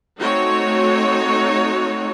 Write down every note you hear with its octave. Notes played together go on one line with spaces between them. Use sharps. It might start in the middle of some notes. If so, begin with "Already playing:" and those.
A3 C4 D#4 F#4 C#5